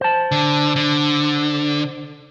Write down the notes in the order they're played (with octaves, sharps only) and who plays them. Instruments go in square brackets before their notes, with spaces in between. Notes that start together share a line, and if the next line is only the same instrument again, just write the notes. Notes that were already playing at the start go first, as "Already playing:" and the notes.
[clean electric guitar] C5 A5
[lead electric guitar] D3
D3